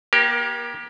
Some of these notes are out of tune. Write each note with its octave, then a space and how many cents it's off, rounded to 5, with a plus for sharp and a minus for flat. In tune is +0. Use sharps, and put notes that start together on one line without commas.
A#3 +35 G4 +0 A#4 +20